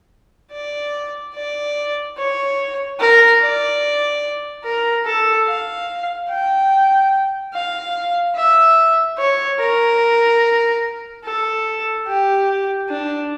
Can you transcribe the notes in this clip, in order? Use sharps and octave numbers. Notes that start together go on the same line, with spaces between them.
D5
D5
C#5
A#4
D5
A#4
A4
F5
G5
F5
E5
C#5
A#4
A4
G4
D4